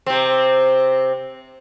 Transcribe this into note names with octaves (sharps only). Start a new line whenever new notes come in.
C3 C4